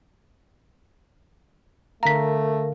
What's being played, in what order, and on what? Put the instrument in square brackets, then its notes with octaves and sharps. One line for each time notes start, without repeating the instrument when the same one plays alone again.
[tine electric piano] D3 F5 [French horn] A3 [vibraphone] A#4 [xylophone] A#5 B6